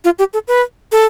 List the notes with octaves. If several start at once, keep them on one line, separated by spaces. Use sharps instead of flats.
F4
G4
A4
B4
A4